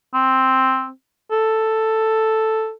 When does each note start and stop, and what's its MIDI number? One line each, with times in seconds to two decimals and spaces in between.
0.14 0.90 60
1.31 2.72 69